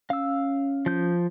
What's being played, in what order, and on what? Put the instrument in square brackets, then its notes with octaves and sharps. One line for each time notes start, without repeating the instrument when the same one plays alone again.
[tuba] C#4 [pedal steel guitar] F5 E6
[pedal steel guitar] F3 G6